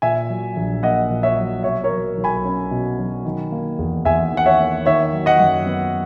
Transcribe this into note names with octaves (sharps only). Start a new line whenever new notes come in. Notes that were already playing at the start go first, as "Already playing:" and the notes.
A#2 E5 G#5
F#3
A#1
A#3 D#5 F#5
A#2
C#5 E5
F#3
B2 C#5 E5
A#4 C#5
F#3
B1
G#5 B5
C#4
B2
F#3
D#3
A#3
E2
E2 E5 G#5
D#3
F#5
C#5 E5
A#3
D#3 C#5 E5
F#3
D#5 F#5
F#2
B3